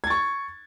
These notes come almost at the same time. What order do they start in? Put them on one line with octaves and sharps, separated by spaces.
G#6 A6 C#6